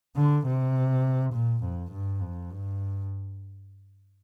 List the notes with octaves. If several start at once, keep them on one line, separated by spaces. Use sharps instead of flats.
D3
C3
A#2
F2
G2
F2
G2